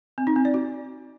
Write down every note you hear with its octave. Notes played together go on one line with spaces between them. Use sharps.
C4
D#4
C4
D5
F#4